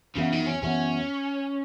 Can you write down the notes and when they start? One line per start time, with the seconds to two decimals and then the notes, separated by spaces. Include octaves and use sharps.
0.16 F#2 C#3 E3 B3
0.33 D#3
0.47 C#4
0.63 F#2 E3 B3 C#4